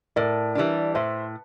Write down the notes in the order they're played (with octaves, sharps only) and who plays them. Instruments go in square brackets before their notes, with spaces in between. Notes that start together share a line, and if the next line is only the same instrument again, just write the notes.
[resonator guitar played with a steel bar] A2 [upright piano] A#4 D5
[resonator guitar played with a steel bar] E3 G3 D4
[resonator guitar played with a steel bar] A2 [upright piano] C5 E5